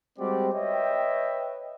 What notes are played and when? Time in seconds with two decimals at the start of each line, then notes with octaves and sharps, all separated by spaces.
0.18 G3 G#3 C4 F#4 G4 D5
0.53 B4 C#5 D#5 E5 G5